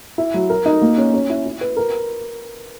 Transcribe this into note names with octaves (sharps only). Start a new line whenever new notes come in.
E4
F#3
A#4
D#4
A#3
C#4
C#4
E4
E4
B4
A#4